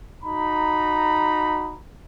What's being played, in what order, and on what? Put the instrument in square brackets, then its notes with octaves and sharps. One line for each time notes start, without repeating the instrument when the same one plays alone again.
[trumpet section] D#4 F#4 A#5 B5